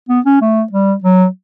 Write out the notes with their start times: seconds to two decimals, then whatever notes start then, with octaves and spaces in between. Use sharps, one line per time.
0.09 B3
0.26 C#4
0.41 A3
0.72 G3
1.04 F#3